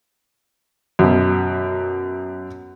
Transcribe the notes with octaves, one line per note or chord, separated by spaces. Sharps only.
F#2 B2